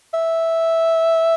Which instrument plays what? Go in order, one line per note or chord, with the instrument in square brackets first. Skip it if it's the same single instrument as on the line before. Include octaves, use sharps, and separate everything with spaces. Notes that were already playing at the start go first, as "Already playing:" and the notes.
[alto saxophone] E5